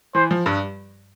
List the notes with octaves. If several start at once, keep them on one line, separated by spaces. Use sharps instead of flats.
E3 C5
F3
G2 G3